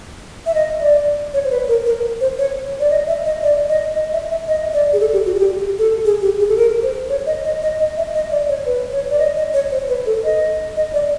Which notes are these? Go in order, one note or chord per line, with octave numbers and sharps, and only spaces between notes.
E5
D#5
D5
C#5
C5
B4
A#4
A#4
C5
C#5
D5
D#5
E5
D#5
D5
D#5
D#5
E5
E5
D#5
D5
G#4
A4
G4
F#4
G#4
G4
A4
G#4
G4
G#4
A4
A#4
C5
C#5
D#5
D#5
D#5
D#5
E5
D#5
D5
C#5
B4
C#5
D5
D#5
D#5
C#5
C5
B4
A4
D#5
D#5
D5